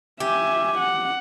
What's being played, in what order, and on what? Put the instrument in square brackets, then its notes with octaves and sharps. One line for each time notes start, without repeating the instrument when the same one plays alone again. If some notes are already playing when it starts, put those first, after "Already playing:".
[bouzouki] G4 [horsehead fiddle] E5 G#5
[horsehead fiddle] F#5